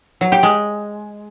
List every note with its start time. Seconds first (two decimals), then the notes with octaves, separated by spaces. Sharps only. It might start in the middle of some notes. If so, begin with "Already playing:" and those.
0.21 F#3
0.32 G4
0.43 G#3